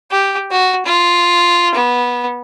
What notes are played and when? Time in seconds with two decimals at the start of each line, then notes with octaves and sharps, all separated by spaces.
0.11 G4
0.51 F#4
0.86 F4
1.74 B3